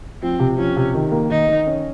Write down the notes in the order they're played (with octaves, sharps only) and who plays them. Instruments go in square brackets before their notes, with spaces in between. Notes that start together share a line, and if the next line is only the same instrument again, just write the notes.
[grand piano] F3 [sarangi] C4
[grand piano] C3
[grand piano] F3 [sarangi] C#4
[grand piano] C3
D#3
A#3
[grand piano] D#3 [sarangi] D#4
[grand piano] D#3
C#4